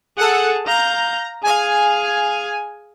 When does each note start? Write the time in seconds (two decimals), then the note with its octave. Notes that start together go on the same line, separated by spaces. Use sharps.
0.17 G#4 A4 F#5 A5
0.66 F5 A#5 G6
1.43 G#4 F5 G#5